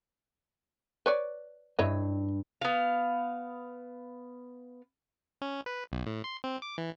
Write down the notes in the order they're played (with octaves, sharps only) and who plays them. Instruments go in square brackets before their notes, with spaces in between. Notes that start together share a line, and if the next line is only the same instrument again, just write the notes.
[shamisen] B4 C#5 D5
[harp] G2 [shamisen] E4 C#5 D#5
[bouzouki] B3 F5
[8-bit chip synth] C#4
B4
B1
A2
C6
C4
D6
E3